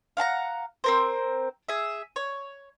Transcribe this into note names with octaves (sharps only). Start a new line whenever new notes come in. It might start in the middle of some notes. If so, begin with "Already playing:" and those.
F5 F#5 A5 A#5
C4 A#4 C5
G#4 E5
C#5